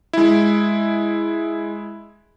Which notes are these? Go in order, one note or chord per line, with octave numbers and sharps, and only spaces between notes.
G#3 E4